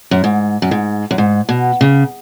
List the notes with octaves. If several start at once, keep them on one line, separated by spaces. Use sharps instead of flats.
F#2
G#2
F#2
G#2
F#2
G#2
B2
C#3